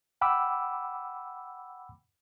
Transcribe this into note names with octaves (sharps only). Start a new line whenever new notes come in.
F#5 G5 B5 D6 E6